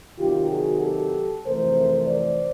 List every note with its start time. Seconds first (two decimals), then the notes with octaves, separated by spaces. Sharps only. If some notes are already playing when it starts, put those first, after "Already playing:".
0.19 C3 D#3 F#3 F4 G4
0.50 F#4 G#4
0.82 G4 A4
1.45 F2 C3 E3 A3 A#4 C5
2.08 C5 D5